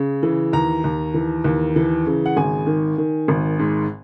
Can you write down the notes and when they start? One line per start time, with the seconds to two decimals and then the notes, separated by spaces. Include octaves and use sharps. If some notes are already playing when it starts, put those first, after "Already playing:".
Already playing: C#3
0.23 E3
0.53 D#2 A#5
0.84 D#2
1.14 E3
1.44 D#2
1.76 E3
2.06 C#3
2.26 F#5
2.36 G#1 G#5
2.67 D#3
2.98 D#3
3.28 G#1
3.59 G#2